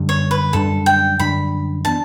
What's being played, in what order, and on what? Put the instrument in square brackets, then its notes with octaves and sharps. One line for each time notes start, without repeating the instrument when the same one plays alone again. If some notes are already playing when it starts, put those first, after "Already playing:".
Already playing: [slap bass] F#2 D3 G3 D4
[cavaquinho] C#5
B4
[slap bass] F#2 D3 G3 D4 [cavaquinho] A4
[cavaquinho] G5
[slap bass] F#2 D3 G3 D4 [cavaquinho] B5
[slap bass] E3 B3 D4 [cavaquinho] A5